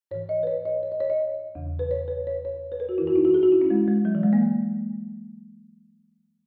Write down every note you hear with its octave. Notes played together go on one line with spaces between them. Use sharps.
G#2 E3 C#5
D#5
B4
C#5
D#5
C#5
D#5
C#5
D#5
E2 C#3 E3
B4
C#5
B4
C#5
C#5
B4
A#4
F#4
F#2 E3 E4
F#4
D#4
F#4
G#4
F#4
E4
C#4
G#3
G#3
F#3
E3
G#3
A#3